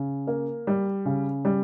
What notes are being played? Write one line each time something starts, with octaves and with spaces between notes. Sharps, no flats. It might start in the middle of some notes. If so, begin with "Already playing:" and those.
Already playing: C#3
A#3
G3
C#3
G3